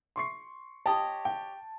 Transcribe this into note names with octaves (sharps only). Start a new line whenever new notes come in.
C6 C#6 C7
G4 C#5 D#5 A5
G5